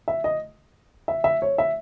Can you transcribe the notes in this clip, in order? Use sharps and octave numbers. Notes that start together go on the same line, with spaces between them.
E5
D#5
E5
E5
C#5
E5